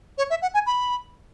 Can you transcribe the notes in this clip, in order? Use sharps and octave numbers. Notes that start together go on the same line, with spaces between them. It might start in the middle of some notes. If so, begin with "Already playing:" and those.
C#5
E5
F#5
G#5
B5